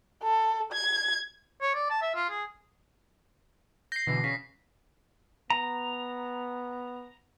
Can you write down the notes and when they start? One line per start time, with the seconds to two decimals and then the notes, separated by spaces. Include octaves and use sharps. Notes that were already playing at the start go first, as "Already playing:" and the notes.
0.23 A4
0.72 G#6
1.62 C#5
1.74 D5
1.90 A5
2.02 E5
2.15 F4
2.30 G#4
3.92 G6 A#6 C7
4.07 B2 D3 E3
4.24 C#3 B6
5.50 B3 A#5